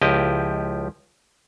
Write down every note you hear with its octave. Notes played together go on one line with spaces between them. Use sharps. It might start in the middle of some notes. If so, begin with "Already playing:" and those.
C#2 F3 E4 G4 D#5